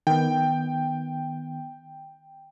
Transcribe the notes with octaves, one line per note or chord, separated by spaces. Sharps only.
D#3 B3 G5